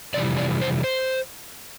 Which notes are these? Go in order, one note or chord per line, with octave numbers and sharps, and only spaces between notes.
F2 C3 E3 G3 D5
D5
C5
C5